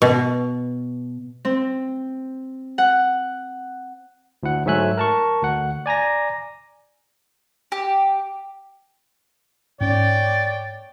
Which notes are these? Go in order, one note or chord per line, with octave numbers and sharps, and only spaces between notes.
B2
C4
F#5
D2 E4 F#5
G#2 F#3 A3 E5 G#5 F#6
A#4 A5 C#6
D2 F#5
D5 G#5 A#5 A#6
G4
G#2 C#4 C#5 D5 G5